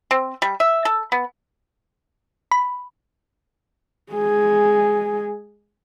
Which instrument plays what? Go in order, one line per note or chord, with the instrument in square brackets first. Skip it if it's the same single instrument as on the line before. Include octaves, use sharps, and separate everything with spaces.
[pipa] C4
G3
E5
A4
B3
[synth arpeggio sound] B5
[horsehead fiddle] G#3 G#4